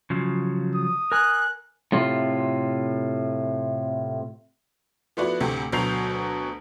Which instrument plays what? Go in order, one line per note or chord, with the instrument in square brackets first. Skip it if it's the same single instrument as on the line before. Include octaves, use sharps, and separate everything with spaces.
[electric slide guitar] C#3 F3 F#3
[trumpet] D#6
[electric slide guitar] A#4 G#5 [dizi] F#6
[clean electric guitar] A2 C3 F4
[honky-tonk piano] F3 A3 B3 E4 F#4 D5
D2 A2 C3 G4
D2 B2 F#3 G6 C7 F7